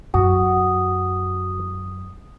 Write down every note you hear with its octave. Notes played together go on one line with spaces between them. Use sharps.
F#2 F#4 D#6